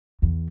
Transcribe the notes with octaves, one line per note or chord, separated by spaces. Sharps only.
E2